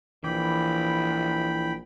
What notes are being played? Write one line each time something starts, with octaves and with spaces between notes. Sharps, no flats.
A#1 E3 G5 B5 D6